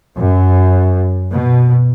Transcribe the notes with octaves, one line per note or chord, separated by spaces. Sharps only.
F#2
B2